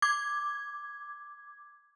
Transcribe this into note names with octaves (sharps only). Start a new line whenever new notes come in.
D6 G#6